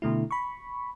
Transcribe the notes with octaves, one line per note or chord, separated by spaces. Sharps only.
B2 D3 A3 E4
B5 C#6